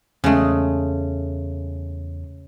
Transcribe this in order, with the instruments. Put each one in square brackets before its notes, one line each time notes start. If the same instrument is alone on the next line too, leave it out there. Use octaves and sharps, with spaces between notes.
[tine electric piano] E2 [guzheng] C#3 G#3 A3